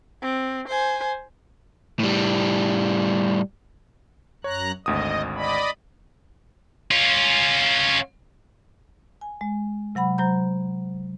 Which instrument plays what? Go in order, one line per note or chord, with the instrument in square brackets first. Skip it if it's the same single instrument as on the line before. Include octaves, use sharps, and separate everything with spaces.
[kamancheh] C4
C5 G#5
[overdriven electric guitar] A2 G3
[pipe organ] F#2 A#5 F#6 [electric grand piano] C#5
[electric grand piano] G#1 D2 D#6 [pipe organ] D#5
[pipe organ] D5 D#5 B5
[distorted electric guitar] C#4 F4
[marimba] G#5
G#3
C3 F#3 F#5 B5
F#3 C5 A#5 G6